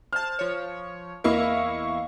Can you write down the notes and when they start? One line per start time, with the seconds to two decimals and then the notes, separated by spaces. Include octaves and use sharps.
0.13 C5 A5 F6
0.39 F3 C#5
1.24 E2 A#3 E4 D#5 F5 C#6